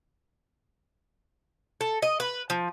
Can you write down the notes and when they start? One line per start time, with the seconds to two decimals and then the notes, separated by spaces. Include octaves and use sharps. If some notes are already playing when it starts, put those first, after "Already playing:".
1.81 A4
2.02 D#5
2.20 B4
2.50 F3